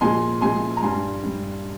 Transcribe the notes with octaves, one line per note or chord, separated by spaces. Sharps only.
A#2 F3 G#3 G#5 C6
A#2 F3 G#3 G#5 C6
A#5
G2 G3 G#5 C6
G2 G3